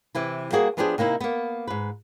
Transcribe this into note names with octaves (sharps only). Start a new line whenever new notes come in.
C3 E3 E4
G3 A#3 F#4 G#4
F3 B3 D4 G4 G#4 C5
C3 A#3 D#4 E4
A#3 B3
G#2 B4